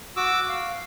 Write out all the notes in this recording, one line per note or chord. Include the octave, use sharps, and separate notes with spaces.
F#4 D6 E6
F5